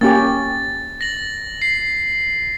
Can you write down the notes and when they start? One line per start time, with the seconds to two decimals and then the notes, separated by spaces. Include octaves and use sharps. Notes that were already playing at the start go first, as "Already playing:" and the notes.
0.01 A#3 C#4 G4 A6
1.01 A#6 F#7
1.62 C7